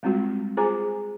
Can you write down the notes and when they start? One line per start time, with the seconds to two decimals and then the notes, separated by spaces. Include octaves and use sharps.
0.03 G3 G#3 C4 F4 F#4
0.57 F4 G#4 C5 G#5 A#5 D6